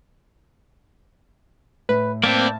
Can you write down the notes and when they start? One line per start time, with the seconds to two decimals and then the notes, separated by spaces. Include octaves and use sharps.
1.89 A2 B4
2.24 A#3 C4 B4 D5 A5